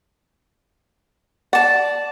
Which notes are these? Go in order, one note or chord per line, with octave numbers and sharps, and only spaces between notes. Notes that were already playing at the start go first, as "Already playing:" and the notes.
D5 F#5 A5